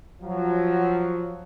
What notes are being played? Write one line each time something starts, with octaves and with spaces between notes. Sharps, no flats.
F3 F#3